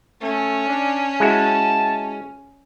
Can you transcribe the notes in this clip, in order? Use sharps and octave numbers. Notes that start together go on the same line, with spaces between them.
A3 C#4
D4
G#3 E4 F#4 A5